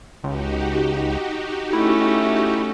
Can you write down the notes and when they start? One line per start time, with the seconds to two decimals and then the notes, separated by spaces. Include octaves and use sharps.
0.24 C#2 D#4 F#4 G4
1.73 A3 C#4 E4